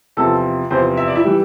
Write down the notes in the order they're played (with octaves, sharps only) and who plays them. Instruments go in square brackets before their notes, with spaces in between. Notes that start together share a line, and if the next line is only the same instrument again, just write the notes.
[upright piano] E2 C3 F3 A4
E2 C3 F3 C4 C5
E5
D5
E4 E5
E3 G3